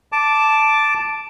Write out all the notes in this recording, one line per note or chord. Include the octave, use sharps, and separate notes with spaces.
A5 D6